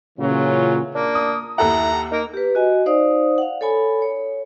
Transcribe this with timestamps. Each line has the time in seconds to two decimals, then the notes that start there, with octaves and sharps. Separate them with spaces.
0.18 A#2 C#3 E3 F#3 C#4 F4
0.95 A#3 D4
1.15 D#6
1.58 D#2 E4 A4 F#5 A#5
2.11 A#3 D#4 A#4
2.34 G4 B4
2.55 F#4 D#5 G#5
2.86 D#4 C5 D5 F5 D#6
3.38 F5 F#5
3.61 A4 C#5 G#5 B5
4.02 C#5